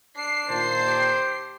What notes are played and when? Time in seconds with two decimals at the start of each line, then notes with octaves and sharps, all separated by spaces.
0.17 D4 C7
0.49 A#2 D#3 C5 A5
0.86 G4